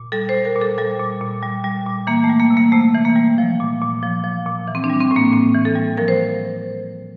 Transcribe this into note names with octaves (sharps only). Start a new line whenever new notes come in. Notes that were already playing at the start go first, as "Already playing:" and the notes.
Already playing: A#2
G3 A4
C5
G3
A#4
A#2
A4
G3 A4
A#2
A#2
G3
G3
A#2
E3 A#3
A3
G3
A#3
C3
A#3
C3 A3
E3
A#3
G3
F3
A#2
A#2
F3
F3
A#2
E3
C4
D4
G3
C4
A2
A#3
A2 C4
E3
A4
G3
F3 A#4
C5